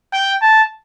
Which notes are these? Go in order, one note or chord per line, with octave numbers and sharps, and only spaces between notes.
G5
A5